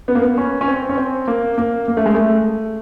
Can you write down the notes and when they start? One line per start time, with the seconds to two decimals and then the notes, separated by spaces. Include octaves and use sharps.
0.08 B3
0.15 A#3
0.22 B3
0.38 C#4
0.61 C#4
0.68 C4
0.89 C#4
0.98 C4
1.28 A#3
1.58 A#3
1.88 A#3
1.97 A3
2.06 G#3
2.15 A3